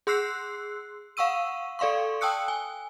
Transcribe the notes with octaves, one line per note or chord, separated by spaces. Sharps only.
G#4 C6 E6 F#6 C7
F5 F#5 C#6 E6 D#7
A4 D5 F5 C6 C#6
G5 A5 D#6 E6 F#6 C#7
G#5